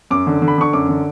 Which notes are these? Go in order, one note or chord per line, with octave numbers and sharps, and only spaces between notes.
F#2 D6
D3
D3
B5
D3 C#6
F#2 D6
D3